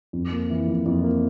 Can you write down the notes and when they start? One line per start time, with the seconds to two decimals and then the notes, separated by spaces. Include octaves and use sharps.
0.13 F2
0.32 A#3
0.50 E3
0.68 F2
0.86 F2
1.04 A#3